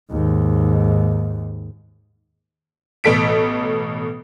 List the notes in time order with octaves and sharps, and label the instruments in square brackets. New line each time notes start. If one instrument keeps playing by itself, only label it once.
[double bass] D#2 G#2
[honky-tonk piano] A1 B2 A4 B6 D7